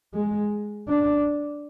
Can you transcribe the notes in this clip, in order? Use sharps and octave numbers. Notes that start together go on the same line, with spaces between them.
G#3
D4